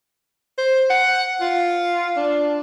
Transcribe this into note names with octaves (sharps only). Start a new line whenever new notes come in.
C5
F#5
F4
D4